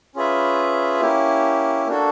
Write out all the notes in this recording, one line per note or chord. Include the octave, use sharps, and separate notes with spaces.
C#4 F4 G#4 B4 E5
A#3 C#4 E4 G4
A#3 D4 F#4 A4